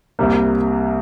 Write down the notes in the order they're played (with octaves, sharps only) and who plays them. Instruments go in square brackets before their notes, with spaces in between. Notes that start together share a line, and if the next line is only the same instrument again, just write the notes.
[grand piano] C2 C3 G3 A#3